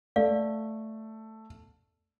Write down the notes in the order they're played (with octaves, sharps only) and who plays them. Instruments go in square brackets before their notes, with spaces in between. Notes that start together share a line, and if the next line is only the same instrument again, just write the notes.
[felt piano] A3 [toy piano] D5 F5